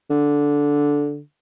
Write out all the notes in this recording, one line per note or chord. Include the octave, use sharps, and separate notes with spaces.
D3